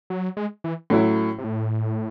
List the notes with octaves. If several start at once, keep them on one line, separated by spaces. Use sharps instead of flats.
F#3
G#3
E3
A2 F#3 C#4 E4
C3
A2